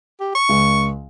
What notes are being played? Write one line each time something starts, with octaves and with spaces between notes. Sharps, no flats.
G4
C#6
C#2